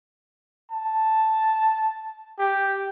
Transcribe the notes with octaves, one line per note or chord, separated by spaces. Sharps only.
A5
G4